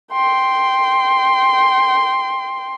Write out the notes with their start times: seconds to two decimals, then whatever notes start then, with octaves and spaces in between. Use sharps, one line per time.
0.13 G5 C6